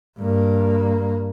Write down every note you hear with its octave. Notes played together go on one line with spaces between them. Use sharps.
G2 A#3